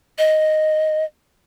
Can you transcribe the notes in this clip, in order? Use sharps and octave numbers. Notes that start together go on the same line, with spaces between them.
D#5